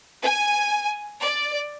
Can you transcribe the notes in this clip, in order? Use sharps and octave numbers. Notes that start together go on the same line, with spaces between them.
G#5
D5